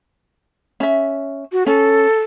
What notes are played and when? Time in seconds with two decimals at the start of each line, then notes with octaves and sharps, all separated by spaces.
0.80 C#4 E5
1.52 F#4
1.66 C#4 A4